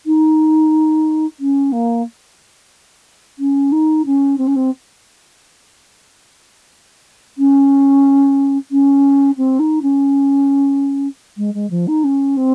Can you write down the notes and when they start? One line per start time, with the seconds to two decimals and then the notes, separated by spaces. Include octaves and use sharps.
0.06 D#4
1.39 C#4
1.72 A#3
3.38 C#4
3.72 D#4
4.06 C#4
4.38 C4
4.47 C#4
4.56 C4
7.38 C#4
8.71 C#4
9.37 C4
9.59 D#4
9.82 C#4
11.37 G#3
11.54 G#3
11.70 F3
11.87 D#4
12.04 C#4
12.37 C4